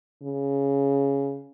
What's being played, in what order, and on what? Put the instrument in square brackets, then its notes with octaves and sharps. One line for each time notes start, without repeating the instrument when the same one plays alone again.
[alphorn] C#3